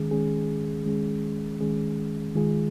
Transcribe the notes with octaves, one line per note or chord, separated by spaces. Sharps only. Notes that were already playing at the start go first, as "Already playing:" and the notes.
Already playing: D#3 G#3 C#4 G#4
D#3 G#3 C#4 G#4
D#3 G#3 C#4 G#4
D#3 G#3 C#4 G#4
D#3 G#3 F4 G#4